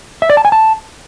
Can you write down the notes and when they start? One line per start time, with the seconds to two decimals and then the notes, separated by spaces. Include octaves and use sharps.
0.22 E5
0.30 D5
0.37 A5
0.45 G#5
0.52 A5